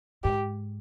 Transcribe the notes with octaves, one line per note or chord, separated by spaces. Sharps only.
G#2 G4